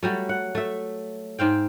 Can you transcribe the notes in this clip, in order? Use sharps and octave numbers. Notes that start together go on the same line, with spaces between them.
F#3 G3 A3
F#5
A3 E5
G#2 C4 F5 G5